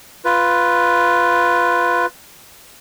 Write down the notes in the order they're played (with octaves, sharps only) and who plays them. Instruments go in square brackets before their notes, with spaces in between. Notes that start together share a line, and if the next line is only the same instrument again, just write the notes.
[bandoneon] F4 B4